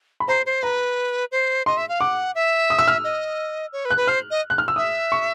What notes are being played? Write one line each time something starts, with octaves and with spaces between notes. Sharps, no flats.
B5
C5 A#5
C5
B4 A#5
C5
D#5 C6
E5
F5
F#5 D6
E5
D#6
E6
F6
D#5
C#5
B4
F#6
B4
C5 F6
D#5
F#6
F6
E6
E5 D#6
C#6